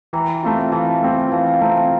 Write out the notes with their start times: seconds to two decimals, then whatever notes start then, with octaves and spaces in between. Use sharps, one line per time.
0.13 E3 G5 A#5
0.43 A3 C4 F4
0.72 E3 F5 A5
1.03 A3 C4 F4
1.32 E3 F5 A5
1.47 F5 A5
1.61 A3 C4 F4 G5 A#5
1.76 F5 A5